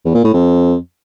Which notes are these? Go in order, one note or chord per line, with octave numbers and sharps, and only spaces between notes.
E2
A#2
A2
F2